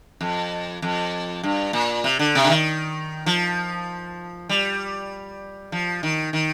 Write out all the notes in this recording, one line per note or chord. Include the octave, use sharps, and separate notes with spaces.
F2
F2
G2
A#2
C3
D3
C3
D3
D#3
F3
G3
F3
D#3
D#3